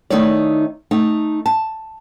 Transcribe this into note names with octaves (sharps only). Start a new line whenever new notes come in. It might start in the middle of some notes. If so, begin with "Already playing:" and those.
D#3 A3 D#4 E4 C#5 D5
A3 D#4
A5